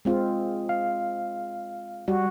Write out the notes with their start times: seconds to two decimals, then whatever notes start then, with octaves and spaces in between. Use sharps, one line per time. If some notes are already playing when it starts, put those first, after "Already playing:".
0.05 G#3 C4 F4
0.69 F5
2.08 G3 F#4